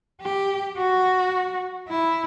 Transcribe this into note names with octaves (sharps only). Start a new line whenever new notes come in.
G4
F#4
E4